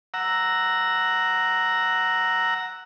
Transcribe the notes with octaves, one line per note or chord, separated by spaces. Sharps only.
F#5 A#5 E6